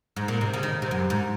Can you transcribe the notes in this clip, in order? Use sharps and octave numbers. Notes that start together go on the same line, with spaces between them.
G#2
A#2
C3
C#3
D#3
C3
F#2
G#2